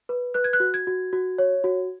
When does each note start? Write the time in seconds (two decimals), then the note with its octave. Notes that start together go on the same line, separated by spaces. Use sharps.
0.09 B4
0.34 B4 F#6
0.44 G#6
0.53 F#6
0.60 F#4
0.74 G#6
0.87 F#4
1.13 F#4
1.38 C#5
1.64 F#4